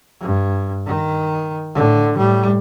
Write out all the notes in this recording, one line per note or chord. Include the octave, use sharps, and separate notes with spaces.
G2
D#3
A2 D3
A2 G3